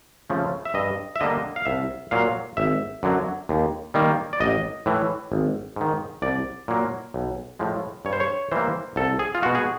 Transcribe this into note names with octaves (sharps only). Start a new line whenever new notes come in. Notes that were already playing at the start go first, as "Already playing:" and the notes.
C#3 F3 A3
E5
G2 D#5
E5
D3 G3 A#3 D#5
F5
C2 E5
A#2 F#3 F5
G#1 E5
F#2 D3 F#3
D#2
D#3 G3 A#3
D5
A1 D#5
A2 E3
G#1
G#2 D#3
C2 D5
A#2 F#3 A#3
B1
A2 F3 G#3
G2 C#5
C5
C#5
E3 G3 A#3 C5
C2 A4
G#4
F4
B2 G#3 F#4
G#4